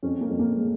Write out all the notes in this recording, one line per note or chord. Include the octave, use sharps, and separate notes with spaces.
F2 C#4
A#3
F2
A#3
G#3